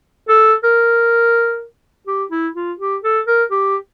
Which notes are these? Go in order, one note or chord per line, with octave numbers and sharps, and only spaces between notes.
A4
A#4
G4
E4
F4
G4
A4
A#4
G4